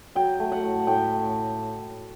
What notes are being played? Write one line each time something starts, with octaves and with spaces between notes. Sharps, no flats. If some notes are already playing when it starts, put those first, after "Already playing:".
F#3 G5
A3
F#5
A2
A2 G5